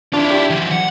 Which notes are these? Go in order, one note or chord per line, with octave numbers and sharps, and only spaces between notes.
D4 E4 F4
G4
E3 F#3
F#5